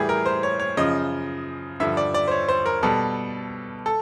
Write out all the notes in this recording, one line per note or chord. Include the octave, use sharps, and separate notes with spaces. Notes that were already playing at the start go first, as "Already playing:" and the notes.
Already playing: A2 E3 G3 G4 G#4
A#4
C5
C#5
C#5
F#2 C#3 F3 D#5
G2 D3 F3 E5
D5
D5
C5
C#5
C5
A#4
B2 G3 A4
A4